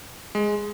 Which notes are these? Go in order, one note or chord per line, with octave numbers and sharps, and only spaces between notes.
G#3